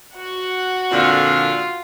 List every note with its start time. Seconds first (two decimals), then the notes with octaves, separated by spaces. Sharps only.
0.16 F#4 F#5
0.92 F2 A#2 D3 F4